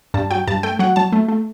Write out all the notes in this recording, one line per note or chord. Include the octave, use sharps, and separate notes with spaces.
G2 A5
F#3 G5
G2 A5
A3 G5
F#3 F#5
F#3 A5
A3
A3